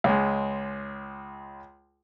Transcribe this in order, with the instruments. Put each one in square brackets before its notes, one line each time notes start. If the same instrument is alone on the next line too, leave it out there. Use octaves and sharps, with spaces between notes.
[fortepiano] C#2 G#3